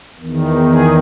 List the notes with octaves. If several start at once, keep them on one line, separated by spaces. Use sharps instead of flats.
E2 D#3
G#4